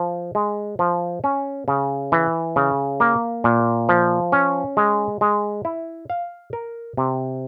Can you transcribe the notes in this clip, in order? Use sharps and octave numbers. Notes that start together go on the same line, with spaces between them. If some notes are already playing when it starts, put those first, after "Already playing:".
Already playing: F3
G#3
F3
C#4
C#3
E3
C#3
A#3
A#2
F3
C#4
G#3
G#3
E4
F5
A#4
C3